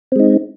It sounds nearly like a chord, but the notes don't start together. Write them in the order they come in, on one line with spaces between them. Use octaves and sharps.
C4 G#3 D#4